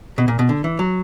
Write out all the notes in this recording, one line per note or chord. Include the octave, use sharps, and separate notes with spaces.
B2
A#2
B2
D3
E3
F#3